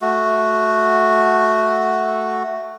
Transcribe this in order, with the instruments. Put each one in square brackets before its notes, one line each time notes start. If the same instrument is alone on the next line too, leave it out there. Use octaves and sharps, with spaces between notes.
[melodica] A3 F#4